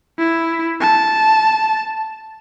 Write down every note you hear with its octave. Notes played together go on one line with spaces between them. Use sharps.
E4
A5